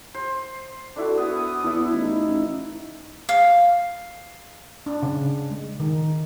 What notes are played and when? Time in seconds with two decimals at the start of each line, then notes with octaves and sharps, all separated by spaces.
0.14 C5
0.96 D4 E4 F#4 A4
1.18 B3 D#6
1.63 E2 E4 A4
1.93 A1 D#4
2.27 A1
3.29 F5
4.86 D4
5.03 C#3
5.51 G#3
5.80 D#3